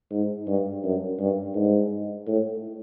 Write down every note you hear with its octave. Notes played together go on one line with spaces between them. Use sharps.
G#2
G2
F#2
G2
G#2
A2